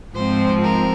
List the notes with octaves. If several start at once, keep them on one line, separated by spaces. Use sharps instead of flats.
G#2 F3 G#3 C4 C5
A#4